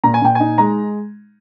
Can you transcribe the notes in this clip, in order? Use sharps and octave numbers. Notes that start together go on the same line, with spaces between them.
A#2 A#5
G#5
A#2 G5
D#4 G#5
G#3 A#5